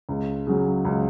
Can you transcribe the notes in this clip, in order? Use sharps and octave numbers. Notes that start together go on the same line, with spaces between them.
C#2
C#3 F#3
C#2